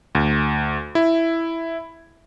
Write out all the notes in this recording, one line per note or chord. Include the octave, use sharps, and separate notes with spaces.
D2
E4